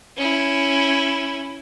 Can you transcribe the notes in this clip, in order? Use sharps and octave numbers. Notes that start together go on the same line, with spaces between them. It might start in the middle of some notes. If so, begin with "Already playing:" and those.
C#4 E4